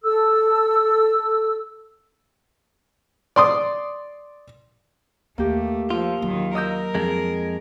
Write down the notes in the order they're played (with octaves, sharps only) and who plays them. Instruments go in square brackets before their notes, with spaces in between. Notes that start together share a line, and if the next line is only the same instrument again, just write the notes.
[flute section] A4 E6
[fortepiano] D5 C6 D#6
[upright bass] D#2 [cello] A3 [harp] A#3 G4
[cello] F3 [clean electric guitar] F4 [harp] E6
[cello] D#2 D#3 [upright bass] F#3
[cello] A#4 [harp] D#5 E6 G6
[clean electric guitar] F2 G#3